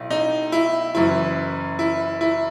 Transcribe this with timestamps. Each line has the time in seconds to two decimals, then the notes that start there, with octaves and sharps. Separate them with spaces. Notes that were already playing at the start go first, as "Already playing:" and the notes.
Already playing: B1 A2
0.10 D#4
0.52 E4
0.95 F#1 F#2 E3 E4
1.79 E4
2.21 E4